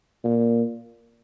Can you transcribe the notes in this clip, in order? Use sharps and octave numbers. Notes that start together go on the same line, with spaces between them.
A#2